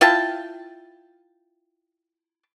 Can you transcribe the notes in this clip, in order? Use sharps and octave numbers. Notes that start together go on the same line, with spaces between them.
E4 F4 G5 A5